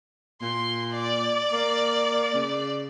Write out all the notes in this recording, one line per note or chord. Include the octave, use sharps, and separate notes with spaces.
A#2 C6
D5
A#3
C#3